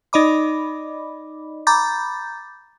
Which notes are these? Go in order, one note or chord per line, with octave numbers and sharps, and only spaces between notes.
D#4 D5 D#5 B5 D6
A#5 B5 D6 G6 A6